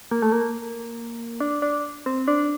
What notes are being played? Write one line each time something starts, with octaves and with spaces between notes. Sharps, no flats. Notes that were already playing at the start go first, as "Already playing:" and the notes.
A#3
A3
A#3
D4
D4
C4
D4